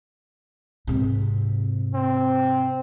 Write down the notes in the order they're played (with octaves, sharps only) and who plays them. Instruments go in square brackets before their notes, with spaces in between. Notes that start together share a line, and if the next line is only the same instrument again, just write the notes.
[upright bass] G#2 C3
[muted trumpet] C4